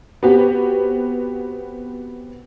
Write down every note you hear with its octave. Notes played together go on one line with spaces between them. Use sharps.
B3 C4 F#4 G4